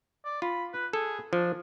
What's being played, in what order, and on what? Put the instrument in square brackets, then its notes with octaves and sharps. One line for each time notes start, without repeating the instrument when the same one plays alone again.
[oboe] D5
[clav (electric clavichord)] F4 [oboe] B5
[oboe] B4
[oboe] G#4 [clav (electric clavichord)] A4
[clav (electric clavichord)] F3 [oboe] D4